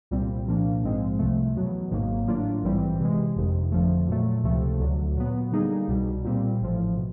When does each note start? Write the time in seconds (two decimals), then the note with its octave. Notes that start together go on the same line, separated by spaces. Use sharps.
0.11 C2 A#2 G3 C4
0.47 C2 A#2 F3 A#3 D4
0.83 A#1 G#2 F3 G#3 C4
1.19 C2 C3 F3 A3
1.56 E2 B2 F#3
1.91 G#1 G#2 D#3 F#3 A#3
2.27 A2 F#3 A#3 D4 F4
2.63 A#1 G#2 E3 G3 C4
2.99 C3 E3 G#3
3.36 G1 F2 C3 D#3
3.72 F2 D3 F3 A3
4.08 A#2 F#3 A3
4.43 C#2 C3 F3 A3
4.79 D2 D3 F#3
5.16 A#2 F#3 B3
5.52 D3 G3 A#3 D#4 G#4
5.88 C2 B2 G3
6.25 A#2 G3 C4
6.61 A1 A2 F3
6.97 B2